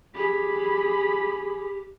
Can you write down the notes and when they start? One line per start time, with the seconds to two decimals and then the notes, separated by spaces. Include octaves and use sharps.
0.16 G4 G#4 B5